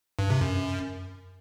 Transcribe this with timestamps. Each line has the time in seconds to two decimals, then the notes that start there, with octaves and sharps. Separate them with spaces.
0.19 G2
0.30 C3
0.41 F#2